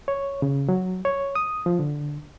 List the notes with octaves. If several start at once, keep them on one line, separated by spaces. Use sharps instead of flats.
C#5
C#3
F#3
C#5
D#6
F3
D3